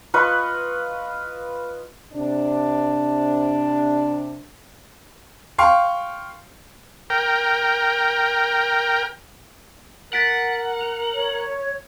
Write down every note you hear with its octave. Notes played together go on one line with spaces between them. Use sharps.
F4 B4 D#5 C#6
C3 D4
F5 G5 C6 C#6
A#4 G5
A#4 F#5 A6 B6 D7
F7
C#5